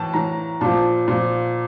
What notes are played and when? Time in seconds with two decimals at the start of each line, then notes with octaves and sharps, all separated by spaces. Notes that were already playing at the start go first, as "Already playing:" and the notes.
Already playing: A2 E3 A5
0.14 A2 E3 A#5
0.61 A#2 F3 A5
1.08 A#2 F3